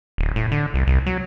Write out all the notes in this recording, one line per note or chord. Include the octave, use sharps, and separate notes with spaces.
D1
A2
D3
C2
C2
F#3